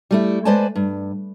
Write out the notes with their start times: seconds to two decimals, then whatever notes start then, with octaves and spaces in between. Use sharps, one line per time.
0.11 G3 A3 E4
0.45 G#3 B4 C5 D5 G#5 A5
0.75 G2